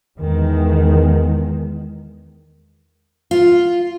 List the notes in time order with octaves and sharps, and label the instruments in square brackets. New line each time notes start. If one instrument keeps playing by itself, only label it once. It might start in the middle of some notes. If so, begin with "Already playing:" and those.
[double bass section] E2 D#3 G#3
[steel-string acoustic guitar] F4